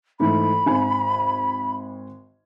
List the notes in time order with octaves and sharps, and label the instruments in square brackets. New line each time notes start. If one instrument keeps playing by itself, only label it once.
[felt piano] G#2 E3 A3 [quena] B5
[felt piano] G#1 G#5